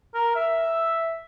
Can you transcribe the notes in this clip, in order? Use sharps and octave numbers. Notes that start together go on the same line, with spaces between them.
A#4
E5